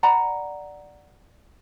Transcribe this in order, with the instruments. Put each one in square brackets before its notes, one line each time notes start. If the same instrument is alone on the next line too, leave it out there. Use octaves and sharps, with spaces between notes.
[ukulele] D5 F#5 A#5 B5